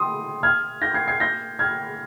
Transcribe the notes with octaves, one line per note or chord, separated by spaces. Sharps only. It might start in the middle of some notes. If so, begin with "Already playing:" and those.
Already playing: C6 D#6
F6 G#6
G6 A#6
G#6 C7
G#6 C7
G6 A#6
F6 G#6